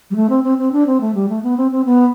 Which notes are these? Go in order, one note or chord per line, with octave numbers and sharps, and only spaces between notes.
G3
A3
C4
C4
C4
D4
C4
A3
G3
A3
B3
C4
C4
B3